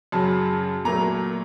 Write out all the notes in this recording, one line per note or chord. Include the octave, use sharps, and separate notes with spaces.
F#2 C#3 F#3 A5
A#2 F#3 A3 A#5